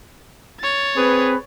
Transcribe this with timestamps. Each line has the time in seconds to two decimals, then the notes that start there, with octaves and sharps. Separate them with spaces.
0.60 C#5 A6
0.96 C4 G#4 B4